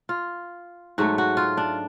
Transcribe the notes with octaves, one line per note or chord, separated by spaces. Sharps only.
F4
G#2 F#3 A3 F#4
F#4
F4
D4